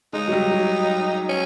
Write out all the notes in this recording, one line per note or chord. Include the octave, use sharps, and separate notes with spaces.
G#3 D#4
F#3
G3
F#3
C#4